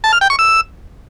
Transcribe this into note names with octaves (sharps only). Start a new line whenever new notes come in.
A5
F6
G5
C#6
E6